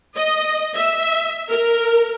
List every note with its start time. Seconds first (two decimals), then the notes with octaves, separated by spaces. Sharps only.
0.17 D#5
0.75 E5
1.49 A#4